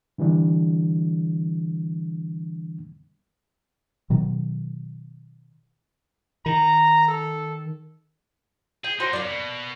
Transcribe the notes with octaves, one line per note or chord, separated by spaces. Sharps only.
D3 E3 G3 D4
B2 D#3 F#3
D#3 A#5
A4
G#4 G5
A#3 C#4 D#4 F#4 C5
F#2 A#3 D5
B2